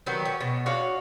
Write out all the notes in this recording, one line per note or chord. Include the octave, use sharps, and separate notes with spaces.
D#3 F#3 B3 G4
C#4
B2
D4 F#4 C#5 F5